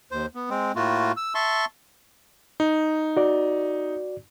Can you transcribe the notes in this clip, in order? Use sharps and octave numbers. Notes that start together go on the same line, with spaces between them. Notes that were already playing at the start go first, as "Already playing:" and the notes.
D#2 C5
B3
G#3 C4
A2 A3 A#3 F4 F#4
E6
E5 A5 C6 C#6
D#4
F#4 D5